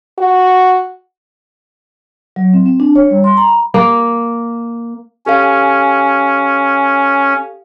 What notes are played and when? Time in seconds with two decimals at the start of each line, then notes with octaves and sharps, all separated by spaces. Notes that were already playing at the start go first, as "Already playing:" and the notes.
0.18 F#4
2.36 F#3
2.53 C4
2.66 C4
2.80 D4
2.96 C#5
3.10 G3
3.24 C6
3.37 A#5
3.48 B5
3.74 A#3
5.26 C#4 G4 A4 F5